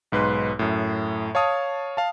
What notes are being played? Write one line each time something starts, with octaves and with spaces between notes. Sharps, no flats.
B1 G#2 B4 C6
F#2 A2
C#5 F5 A5 D#6
F5 A5